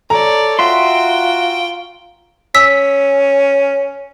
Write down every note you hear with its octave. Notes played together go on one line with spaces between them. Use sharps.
A4 C#5 D5 A#5
F4 F#4 E5 G5 C6
C#4 E6 B6